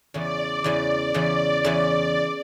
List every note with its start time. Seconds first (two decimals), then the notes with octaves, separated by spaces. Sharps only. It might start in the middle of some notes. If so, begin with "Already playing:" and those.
0.14 E2 C#3 E3 D5
0.64 E2 C#3 E3
1.14 E2 C#3 E3 D5
1.64 E2 C#3 E3